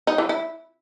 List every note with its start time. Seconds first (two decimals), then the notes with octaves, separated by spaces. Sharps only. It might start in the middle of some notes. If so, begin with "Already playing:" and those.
0.07 D#4
0.18 E3
0.29 E4